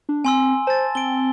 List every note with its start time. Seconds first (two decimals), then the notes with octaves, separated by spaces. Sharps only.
0.09 D4
0.25 C4 G#5 C6 E6
0.67 C5 A5 A6
0.95 C4 D7 G7